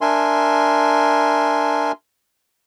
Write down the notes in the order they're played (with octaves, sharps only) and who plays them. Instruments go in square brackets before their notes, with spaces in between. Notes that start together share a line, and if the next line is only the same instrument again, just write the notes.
[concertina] D4 A#4 E5 G#5 C6